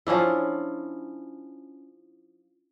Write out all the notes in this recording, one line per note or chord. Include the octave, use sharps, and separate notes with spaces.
F3 C#4 D4 E4